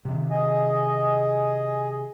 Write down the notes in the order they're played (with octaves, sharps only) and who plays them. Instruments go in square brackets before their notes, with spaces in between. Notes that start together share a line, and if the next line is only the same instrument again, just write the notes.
[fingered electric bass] C3 D#3
[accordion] G#4 D#5